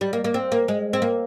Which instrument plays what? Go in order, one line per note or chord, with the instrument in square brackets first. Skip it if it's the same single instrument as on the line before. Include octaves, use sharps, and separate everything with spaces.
[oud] G3
A#3
A#3
C4
A#3
G#3
C4
A#3